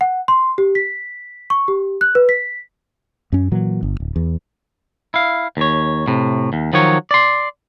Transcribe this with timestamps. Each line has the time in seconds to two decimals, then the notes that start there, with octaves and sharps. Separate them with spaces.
0.01 F#5
0.28 C6
0.58 G4
0.75 B6
1.50 C#6
1.68 G4
2.01 F#6
2.15 B4
2.29 B6
3.32 F#2 C#4
3.52 A#2 E3 F#3
3.83 G1
4.00 D1
4.16 E2
5.14 E4 F5
5.57 D#2 C#5
6.08 A2 C3
6.53 D#2
6.73 D#3 F3 F#3 C#5
7.11 D5 C6